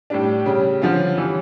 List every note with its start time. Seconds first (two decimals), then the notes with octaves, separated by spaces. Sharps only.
0.10 A2 G3 D4
0.46 C#3 G3 C#4
0.82 D3 F3 C#4 F4
1.18 E3 G3 C#4